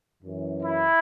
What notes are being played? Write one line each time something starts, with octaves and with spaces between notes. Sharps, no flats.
F#2 E3
E4